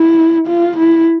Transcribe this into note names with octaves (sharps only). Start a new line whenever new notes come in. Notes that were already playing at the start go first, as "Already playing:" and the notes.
Already playing: E4
F4
E4